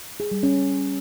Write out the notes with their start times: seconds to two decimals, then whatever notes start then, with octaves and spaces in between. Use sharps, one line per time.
0.20 G#4
0.31 G3
0.43 C#4